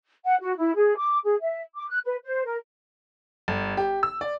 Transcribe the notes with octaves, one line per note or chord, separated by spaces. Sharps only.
F#5
F#4
E4
G#4
D6
G#4
E5
D6
F#6
B4
C5
A#4
G1
G4
E6
D5